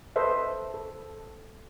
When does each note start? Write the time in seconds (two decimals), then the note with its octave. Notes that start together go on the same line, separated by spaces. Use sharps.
0.16 A4 B4 C5 D#5 E5
0.74 A4